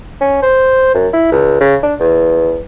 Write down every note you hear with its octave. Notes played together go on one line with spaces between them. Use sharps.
C#4
C5
F#2
E4
C#2
C#3
D4
E2